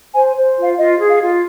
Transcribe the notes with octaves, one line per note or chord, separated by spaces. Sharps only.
C5 G#5
C5
F4
F5
F4 D#5
G#4
F5
F4